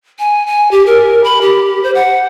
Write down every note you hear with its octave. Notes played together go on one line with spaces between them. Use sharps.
G#5
G#5
G4
A#4
B5
G4
C5
F#5